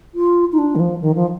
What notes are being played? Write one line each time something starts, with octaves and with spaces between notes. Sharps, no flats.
F4
D#4
D4
D#3
F3
D#3
F3